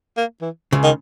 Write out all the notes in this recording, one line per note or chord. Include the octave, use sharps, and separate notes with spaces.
A#3
E3
C#2 C#3
D#3